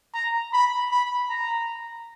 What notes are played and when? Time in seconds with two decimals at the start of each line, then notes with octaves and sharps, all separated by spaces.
0.14 A#5
0.53 B5
0.91 B5
1.29 A#5